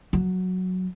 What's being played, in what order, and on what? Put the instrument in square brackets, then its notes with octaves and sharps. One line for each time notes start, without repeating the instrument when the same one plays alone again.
[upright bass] F#3